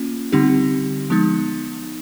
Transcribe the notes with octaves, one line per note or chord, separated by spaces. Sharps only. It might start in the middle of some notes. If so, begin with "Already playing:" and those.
Already playing: A#3 C#4 F4
D3 G3 C4 D#4 G4
F3 G#3 B3 D#4